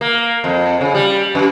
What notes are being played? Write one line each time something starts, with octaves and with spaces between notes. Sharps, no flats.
A#3
F2
C#3
G3
F#2